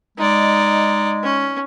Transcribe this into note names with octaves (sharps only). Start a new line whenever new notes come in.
G#3 D#4 D5
C#4